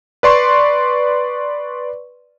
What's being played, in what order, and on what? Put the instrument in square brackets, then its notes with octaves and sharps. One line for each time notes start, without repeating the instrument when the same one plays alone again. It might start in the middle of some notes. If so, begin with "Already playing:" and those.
[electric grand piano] B4 D5 C6 C#6